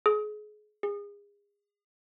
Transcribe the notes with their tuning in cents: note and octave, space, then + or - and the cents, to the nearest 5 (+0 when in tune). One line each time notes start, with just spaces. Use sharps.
G#4 +30
G#4 -30